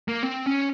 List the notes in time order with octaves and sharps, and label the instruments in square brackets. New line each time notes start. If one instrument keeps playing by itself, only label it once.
[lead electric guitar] A#3
C4
C#4